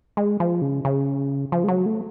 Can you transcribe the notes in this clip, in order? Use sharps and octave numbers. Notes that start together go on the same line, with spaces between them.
G#3
F3
C#3
C#3
F3
G#3
F#3
A3